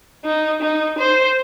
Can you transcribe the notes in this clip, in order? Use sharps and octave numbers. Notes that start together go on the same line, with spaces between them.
D#4
D#4
C5